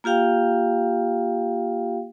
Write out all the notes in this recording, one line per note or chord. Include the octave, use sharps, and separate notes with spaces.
A#3 F4 G4 F5 G5